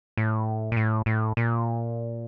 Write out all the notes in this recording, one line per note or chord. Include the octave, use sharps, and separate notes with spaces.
A2
A#2
A2
A2
A#2